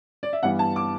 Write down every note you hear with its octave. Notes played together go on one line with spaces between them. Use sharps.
D5
E5
G2 E3 G3 B3 F#5
A5
D6